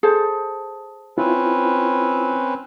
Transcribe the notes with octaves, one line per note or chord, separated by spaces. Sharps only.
G#4 A4 C5
C4 C#4 E4 F4 B4